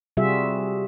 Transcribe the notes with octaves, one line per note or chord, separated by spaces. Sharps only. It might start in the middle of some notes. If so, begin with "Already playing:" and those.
C3 G3 F4 F#4 G#4 E5